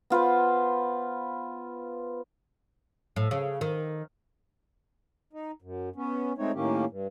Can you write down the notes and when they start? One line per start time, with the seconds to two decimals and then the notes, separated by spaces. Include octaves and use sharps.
0.10 B3 F4 B4 C5
3.16 A2
3.31 C#3
3.61 D#3
5.33 D#4
5.62 F#2
5.96 B3 C#4
6.38 G#3 A3 C4 D#4 C#5
6.54 A2 D#3 A#3 C#4 G4
6.89 G2